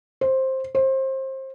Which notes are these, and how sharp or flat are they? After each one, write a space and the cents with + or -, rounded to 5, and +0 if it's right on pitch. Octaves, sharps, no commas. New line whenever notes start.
C5 +10
C5 +25